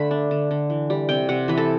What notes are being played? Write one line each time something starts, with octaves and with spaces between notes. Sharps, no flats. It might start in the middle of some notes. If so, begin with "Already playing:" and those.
Already playing: D3 A3 B5
D4
D3
D3
E3
G3
C3 G5
C3 F#5
E3 B4
A4